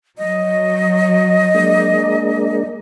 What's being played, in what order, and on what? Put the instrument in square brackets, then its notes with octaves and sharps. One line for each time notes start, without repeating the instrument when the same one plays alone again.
[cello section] F#3 [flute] D#5
[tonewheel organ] G#3 A#3 D4